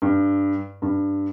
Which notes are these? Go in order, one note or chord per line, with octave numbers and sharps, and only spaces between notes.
G2
G2